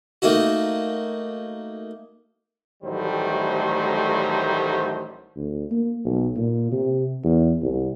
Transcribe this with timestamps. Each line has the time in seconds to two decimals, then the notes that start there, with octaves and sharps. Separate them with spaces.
0.22 A3 A#3 D#4 F#4
2.83 A1 D#3 F#3 G3 A3 C5
5.36 D2
5.71 A#3
6.05 B1
6.37 A#2
6.71 C3
7.24 E2
7.62 C2